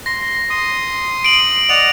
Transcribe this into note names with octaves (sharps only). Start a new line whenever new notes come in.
C6 A#6
C6 D#6
D7 F#7
D5 D#5 F#5 F7